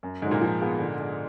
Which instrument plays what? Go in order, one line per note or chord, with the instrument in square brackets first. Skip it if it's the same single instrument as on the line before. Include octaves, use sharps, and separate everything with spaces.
[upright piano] F#2
[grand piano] G#2 G#3 [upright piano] D3
[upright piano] F#3
[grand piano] A#2 A#3
[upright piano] F3
B3 F4 G#4
D3
G#3 D4 G#4